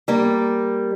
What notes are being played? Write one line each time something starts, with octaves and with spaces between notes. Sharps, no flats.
G3 A#3 D5